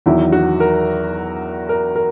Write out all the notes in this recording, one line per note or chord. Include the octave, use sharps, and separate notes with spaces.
E2 D#3 F#3 E4
F#4
A#4
A#4
A#4